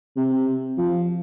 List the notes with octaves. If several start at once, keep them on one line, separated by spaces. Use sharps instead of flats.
C3
F3